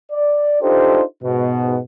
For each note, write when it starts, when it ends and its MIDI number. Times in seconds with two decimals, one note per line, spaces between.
0.11 0.58 74
0.61 1.02 62
0.61 1.02 63
0.61 1.02 65
0.61 1.02 67
0.61 1.02 69
0.61 1.02 72
1.23 1.78 44
1.23 1.78 47